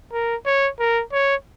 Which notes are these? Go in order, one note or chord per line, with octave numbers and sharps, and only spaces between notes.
A#4
C#5
A#4
C#5